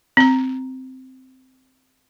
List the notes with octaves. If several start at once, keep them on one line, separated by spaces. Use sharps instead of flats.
C4 A#5